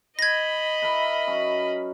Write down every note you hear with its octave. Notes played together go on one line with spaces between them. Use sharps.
D#5 B5 G#6 A#6
E4 A#4 B4
F#3 C#4 D#4